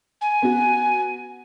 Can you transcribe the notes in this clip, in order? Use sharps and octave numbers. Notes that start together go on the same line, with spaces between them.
G#5
B3 F#4